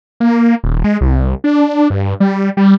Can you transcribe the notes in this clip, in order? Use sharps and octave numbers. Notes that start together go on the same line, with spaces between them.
A#3
D#1
G#3
C2
D4
G2
G3
G3